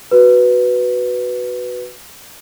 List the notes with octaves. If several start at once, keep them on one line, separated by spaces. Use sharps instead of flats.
F#4 B4